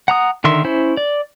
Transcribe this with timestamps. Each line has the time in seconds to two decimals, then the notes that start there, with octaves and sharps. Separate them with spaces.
0.08 F#5 A#5 D#6
0.44 D3 D#3 A#4 E5 C6
0.64 C#4 E4 C5
0.97 D5